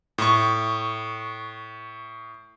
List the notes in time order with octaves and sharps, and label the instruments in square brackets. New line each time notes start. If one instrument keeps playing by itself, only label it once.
[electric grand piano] A2 C#6